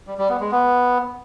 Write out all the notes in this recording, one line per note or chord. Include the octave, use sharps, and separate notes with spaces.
G3
G3
B3
G#3
B3